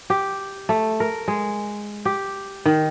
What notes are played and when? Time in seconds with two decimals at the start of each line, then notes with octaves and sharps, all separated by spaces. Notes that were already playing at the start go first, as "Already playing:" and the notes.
0.10 G4
0.69 A3
1.00 A#4
1.28 G#3
2.05 G4
2.65 D#3